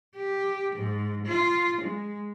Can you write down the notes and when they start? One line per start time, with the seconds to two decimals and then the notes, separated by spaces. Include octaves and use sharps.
0.16 G4
0.76 G#2
1.26 F4
1.82 G#3